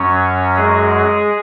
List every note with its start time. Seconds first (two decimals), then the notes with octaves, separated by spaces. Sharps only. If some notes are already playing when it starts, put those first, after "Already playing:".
Already playing: F#2 F#3 C#4 C#5
0.56 G#3 G#4